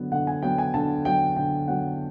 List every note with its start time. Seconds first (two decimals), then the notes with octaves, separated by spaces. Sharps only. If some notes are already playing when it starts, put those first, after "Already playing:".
Already playing: D3 F#3 B3
0.12 D3 F#5
0.27 G#5
0.43 F#3 B3 G5
0.58 G#5
0.74 D3 A5
1.05 F#3 B3 G5
1.37 D3 G5
1.67 F#3 B3 F#5